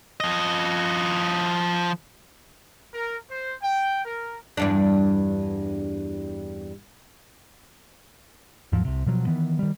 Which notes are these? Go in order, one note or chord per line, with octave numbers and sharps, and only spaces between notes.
F3 D#5
A#4
C5
G5
A#4
E2 G2 D4
D#2 G#2 F3 F#3
C2 C3
B2 F3 F#3
D#3 E3 B3
D#3 G3